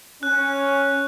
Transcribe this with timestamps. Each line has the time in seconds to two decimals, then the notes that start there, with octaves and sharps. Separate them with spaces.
0.23 C#4 F#6